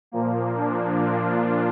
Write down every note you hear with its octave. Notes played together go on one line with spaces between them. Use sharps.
A#2 F3 A#3
D4
F4